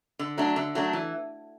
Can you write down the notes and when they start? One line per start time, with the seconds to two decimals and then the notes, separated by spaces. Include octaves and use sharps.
0.19 D3
0.38 F#3 A3 D4
0.56 D3
0.75 F#3 A3 D4
0.93 E3